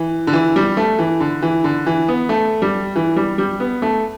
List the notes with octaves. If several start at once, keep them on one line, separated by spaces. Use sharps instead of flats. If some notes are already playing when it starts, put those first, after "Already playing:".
Already playing: E3
D3
E3
G3
A3
E3
D3
E3
D3
E3
B3
A3
G3
E3
G3
G3
B3
A3